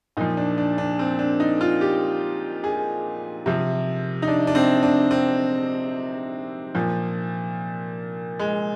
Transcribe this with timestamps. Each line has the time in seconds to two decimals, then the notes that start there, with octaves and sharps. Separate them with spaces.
0.17 A#2 D#4
0.21 F3
0.37 D4
0.58 D4
0.78 D4
0.99 C4
1.19 D4
1.40 D#4
1.61 F4
1.81 G4
2.64 G#4
3.46 C3 F3
4.22 D#4
4.28 D4
4.47 D4
4.55 C4
4.83 D4
5.11 C4
6.75 A#2 F3
8.39 G#3